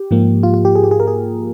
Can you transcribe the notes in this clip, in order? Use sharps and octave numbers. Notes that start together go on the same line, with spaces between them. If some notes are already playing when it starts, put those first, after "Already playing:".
Already playing: G4
G#2 F3 A#3
F4
F4
G4
G#4
G4
G#4
A#4
G#4